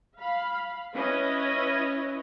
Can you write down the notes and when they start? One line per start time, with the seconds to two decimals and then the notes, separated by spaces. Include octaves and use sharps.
0.19 F5 B5
0.94 C#4 E4 B4 C#5 D#5